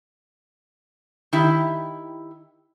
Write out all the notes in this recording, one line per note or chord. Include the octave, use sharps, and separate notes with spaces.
D#3 E4 G4